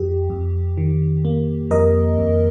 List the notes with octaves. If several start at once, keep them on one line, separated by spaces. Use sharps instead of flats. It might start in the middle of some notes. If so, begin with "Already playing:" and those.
Already playing: F2 G4
F2
D#3
A#3
F2 A#4 D#5
F2